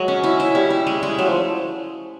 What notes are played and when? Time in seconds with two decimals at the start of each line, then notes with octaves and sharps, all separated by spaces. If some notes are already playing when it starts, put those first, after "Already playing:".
Already playing: F#3 G#3
0.08 C#4
0.24 E4
0.40 E4
0.55 G3 C#4
0.70 E4
0.87 G#3
1.03 G#3
1.18 F#3 A3
1.27 F3